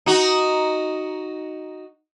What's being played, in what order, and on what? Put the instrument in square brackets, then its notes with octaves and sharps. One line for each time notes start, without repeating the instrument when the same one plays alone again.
[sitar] D#4 F#4